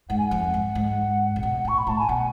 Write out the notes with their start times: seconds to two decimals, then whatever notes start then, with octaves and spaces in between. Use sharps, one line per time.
0.09 G#2 F#5
0.18 G#5
0.28 F2 F#5
0.54 G#2
0.75 G#2
1.36 C#3
1.43 B2
1.65 A2 C#6
1.78 B5
1.87 A2 A5
1.99 G#5
2.09 B2 F#5